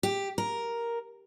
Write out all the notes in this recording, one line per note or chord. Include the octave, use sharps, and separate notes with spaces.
G4
A#4